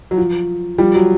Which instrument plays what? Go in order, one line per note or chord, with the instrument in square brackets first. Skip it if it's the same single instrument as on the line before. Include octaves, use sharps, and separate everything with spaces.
[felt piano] F#3
F3
F3 G3
F#3